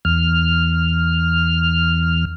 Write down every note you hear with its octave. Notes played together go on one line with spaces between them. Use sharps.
E2 F6